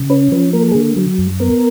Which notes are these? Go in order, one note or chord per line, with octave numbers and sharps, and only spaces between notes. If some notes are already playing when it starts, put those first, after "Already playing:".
Already playing: C#3
C#4 B4
F3 B4
A#3 A#4
A4
D3 G#4
A4
F#3
F#2
B3 A#4